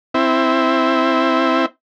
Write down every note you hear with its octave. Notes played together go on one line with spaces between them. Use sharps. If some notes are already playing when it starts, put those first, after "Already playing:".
C4 E4